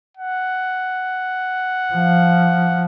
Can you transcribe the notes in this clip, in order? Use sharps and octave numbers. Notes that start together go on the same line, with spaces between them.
F#5
F3